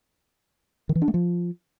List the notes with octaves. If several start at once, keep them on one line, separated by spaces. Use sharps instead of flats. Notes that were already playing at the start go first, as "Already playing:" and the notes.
D#3
E3
D4
A3
F3